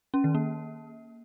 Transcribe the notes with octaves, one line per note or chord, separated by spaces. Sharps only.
C#4
D#3
A#3